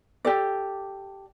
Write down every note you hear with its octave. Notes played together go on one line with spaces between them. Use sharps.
G4 A4 D5